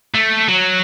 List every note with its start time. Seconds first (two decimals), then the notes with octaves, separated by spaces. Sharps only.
0.14 A3
0.48 F#3